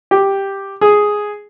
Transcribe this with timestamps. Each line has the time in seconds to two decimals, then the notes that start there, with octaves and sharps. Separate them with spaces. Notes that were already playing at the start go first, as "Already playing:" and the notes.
0.11 G4
0.81 G#4